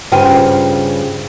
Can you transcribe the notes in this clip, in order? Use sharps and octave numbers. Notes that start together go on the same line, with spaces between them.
G2 C#3 F4 C5 G5 G#5